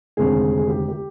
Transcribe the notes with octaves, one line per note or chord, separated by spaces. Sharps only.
F1 D#2 D3 G#3 C4 G#4
G#4
G4
G4